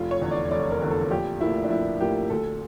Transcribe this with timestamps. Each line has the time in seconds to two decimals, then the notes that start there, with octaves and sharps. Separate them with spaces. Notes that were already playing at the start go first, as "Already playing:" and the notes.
Already playing: F1 F4
0.11 C#5
0.21 E2 D3
0.31 D5
0.51 F1 D5
0.71 A#4
0.81 E2 D3
0.91 A4
1.11 A#1 G4
1.41 A2 F3 A#3 E4
1.64 D4
1.70 A#1 E4
2.00 A2 F3 A#3 G4
2.30 D2 A4